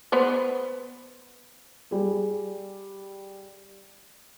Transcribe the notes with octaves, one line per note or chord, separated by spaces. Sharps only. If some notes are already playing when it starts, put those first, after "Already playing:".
B3 B4 C5
G3 G#4